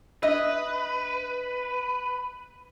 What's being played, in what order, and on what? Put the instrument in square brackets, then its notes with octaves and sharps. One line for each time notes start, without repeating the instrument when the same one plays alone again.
[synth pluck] D4 E5 [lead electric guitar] B4 [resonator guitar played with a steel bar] D#5